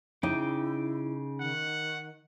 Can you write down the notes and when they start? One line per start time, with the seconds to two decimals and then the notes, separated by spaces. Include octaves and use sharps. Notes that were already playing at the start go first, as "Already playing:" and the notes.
0.23 C#3 D#4 E4 G5 D6
1.40 D#3 F#5